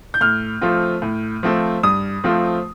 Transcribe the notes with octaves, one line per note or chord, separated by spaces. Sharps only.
G6
A2 F6
F3 A3 C4 F4
A2
F3 A3 C4 F4
G2 D#6
F3 A3 C4 F4